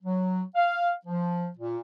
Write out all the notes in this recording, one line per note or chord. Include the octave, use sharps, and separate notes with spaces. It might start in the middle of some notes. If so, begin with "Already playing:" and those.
F#3
F5
F3
A#2